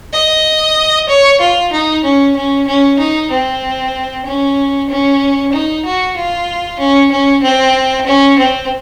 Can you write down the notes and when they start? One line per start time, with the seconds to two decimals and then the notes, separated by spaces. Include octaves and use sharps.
0.13 D#5
1.09 C#5
1.40 F4
1.72 D#4
2.04 C#4
2.36 C#4
2.67 C#4
2.99 D#4
3.31 C4
4.25 C#4
4.89 C#4
5.52 D#4
5.85 F#4
6.16 F4
6.79 C#4
7.11 C#4
7.43 C4
8.07 C#4
8.38 C4